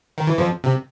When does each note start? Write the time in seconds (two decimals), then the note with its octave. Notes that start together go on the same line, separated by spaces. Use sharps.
0.18 D#3
0.27 E3
0.38 F2 F3
0.64 C3